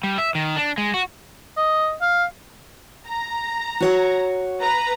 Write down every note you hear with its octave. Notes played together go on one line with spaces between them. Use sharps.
G3
E5
D#3
D4
G#3
F#4
D#5
F5
A#5
F#4 C#5 F#5
B4 A#5